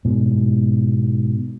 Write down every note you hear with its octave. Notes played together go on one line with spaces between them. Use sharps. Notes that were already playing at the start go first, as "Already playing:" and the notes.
G#2 B2